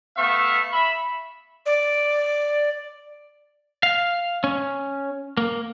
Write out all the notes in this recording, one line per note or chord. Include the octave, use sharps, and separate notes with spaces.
A3 B3 E5 F5 C#6
E5 B5
D5
F5
C#4
A#3